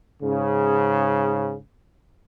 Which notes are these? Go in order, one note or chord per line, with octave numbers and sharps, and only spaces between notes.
G#2 C#3